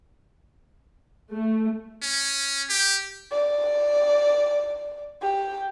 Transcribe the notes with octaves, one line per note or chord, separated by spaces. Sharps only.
A3
C#4
G4
D5
G4